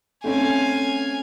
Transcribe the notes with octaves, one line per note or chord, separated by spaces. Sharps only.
A3 C4 C#4 F5 G#5